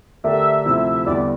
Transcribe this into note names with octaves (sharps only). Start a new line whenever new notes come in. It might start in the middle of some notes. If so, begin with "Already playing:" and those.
D3 A3 D4 G4 A#4 E5
D2 C3 F3 C4 E4
E2 D3 G3 D4 D5